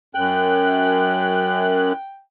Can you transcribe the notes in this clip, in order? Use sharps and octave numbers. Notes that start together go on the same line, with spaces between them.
F#2 G5 F#6